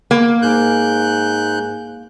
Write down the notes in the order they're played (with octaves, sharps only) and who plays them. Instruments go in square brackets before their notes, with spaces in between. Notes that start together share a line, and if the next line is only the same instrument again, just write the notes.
[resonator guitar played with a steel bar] A#3
[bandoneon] G#2 F#6 G6 [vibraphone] G#4 G#5